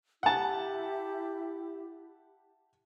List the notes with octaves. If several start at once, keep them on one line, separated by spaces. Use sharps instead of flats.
E4 G4 E5 F#5 A5